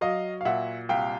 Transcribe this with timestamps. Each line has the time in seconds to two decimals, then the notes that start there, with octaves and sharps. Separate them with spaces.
0.01 F#3 D#5 F5
0.41 F5
0.45 A#2 E5 F#5
0.89 C2 F5 G5